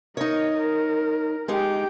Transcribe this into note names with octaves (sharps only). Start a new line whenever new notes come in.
D#4 A#4 C#5 D#5
A#4
G#3 D#4 G4 G5